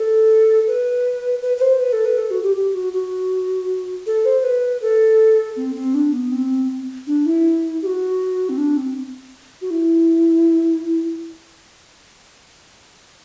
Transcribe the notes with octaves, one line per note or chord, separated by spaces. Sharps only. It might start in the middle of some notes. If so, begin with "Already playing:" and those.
Already playing: A4
B4
B4
B4
C5
B4
A4
B4
A4
F#4
G4
G4
F#4
F#4
A4
C5
B4
A4
C4
C4
D4
B3
C4
D4
E4
G4
F#4
C4
D4
C4
F#4
E4